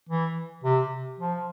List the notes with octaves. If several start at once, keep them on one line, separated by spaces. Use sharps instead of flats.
E3
C3
F3